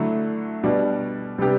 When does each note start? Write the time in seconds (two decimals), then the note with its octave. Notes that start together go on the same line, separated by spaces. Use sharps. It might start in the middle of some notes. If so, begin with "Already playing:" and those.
Already playing: D3 F#3 A3 E4
0.63 B2 G3 D4
1.38 C3 G3 B3 D4 G4